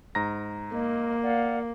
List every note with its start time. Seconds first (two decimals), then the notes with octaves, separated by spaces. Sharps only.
0.15 G#2 A#5 A#6
0.73 A#3 D#5
1.22 D5 F5 F#5